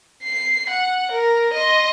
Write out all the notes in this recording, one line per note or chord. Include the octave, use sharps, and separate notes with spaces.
C7
F#5
A#4
D#5 C6